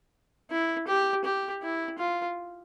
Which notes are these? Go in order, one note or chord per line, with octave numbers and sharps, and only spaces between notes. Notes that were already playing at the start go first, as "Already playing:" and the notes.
E4
G4
G4
E4
F4